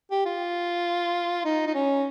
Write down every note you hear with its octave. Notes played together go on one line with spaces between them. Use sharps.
G4
F4
D#4
D#4
C#4